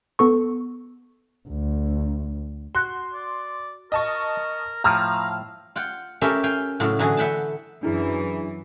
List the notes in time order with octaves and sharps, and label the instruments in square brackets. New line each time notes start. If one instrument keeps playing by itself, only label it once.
[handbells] B3 A4 C#6
[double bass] D2
[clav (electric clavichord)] F#4 [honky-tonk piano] C6
[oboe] D5
[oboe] A#4 [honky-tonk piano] D#5 A5 C#6
[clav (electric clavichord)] A2 F3 [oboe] F5 [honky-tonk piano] A#5 E6 F6
[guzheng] F4 F#5 G5
C#4 F4 G4 A4 A#4 E5
F5 G5 G#5
A2 C#3 F#3 F4
D3 E3 F#3 F#4 G#4
B4 E5 F#5 G5 A5
[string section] F#2 E3 [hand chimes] D4 E4 G#4